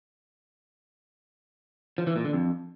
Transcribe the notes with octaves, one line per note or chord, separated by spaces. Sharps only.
F3
E3
A#2
D3
F2